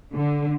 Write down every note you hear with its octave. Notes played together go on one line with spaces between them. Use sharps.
D3